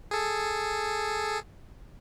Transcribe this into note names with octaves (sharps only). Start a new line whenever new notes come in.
G#4 A4